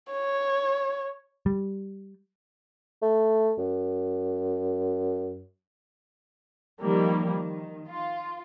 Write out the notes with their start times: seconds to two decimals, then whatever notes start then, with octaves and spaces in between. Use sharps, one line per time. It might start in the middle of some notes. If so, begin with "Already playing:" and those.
0.13 C#5
1.46 G3
3.02 A3
3.58 F#2
6.81 D#3 F3 G3 A#3
7.28 D#3
7.89 F4